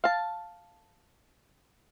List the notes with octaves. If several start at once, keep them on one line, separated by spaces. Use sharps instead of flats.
F5 A5